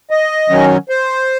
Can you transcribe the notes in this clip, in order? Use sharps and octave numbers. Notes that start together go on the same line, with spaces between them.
D#5
D#3 F#3 C#4
C5